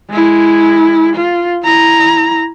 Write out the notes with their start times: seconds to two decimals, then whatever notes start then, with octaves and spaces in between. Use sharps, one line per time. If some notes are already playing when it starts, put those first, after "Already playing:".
0.10 G#3 E4
1.15 F4
1.63 E4 A#5